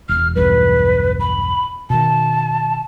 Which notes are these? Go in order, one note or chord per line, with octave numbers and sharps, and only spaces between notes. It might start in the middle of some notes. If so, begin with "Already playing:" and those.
E1 F6
B1 E2 G2 B4
B5
B2 D#3 A5